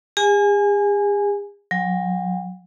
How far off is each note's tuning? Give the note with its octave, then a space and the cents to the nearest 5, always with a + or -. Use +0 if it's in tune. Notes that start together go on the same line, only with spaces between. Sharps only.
G#4 -45 G#5 +0
F#3 -30 G5 +25